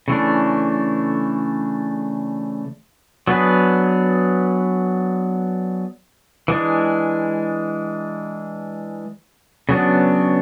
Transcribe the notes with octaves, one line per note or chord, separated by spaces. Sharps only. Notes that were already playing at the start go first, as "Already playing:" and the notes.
C#3 E3 A3 D4
F#3 B3 D4 G#4 B4
E3 G#3 D4
C#3 F#3 B3 D4